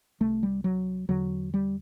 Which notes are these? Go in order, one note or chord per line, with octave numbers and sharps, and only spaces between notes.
C2 C3 A3
G3
F#3
E2 D3 F#3
G3